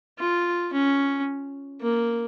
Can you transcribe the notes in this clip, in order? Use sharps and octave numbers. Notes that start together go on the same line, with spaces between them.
F4
C#4
A#3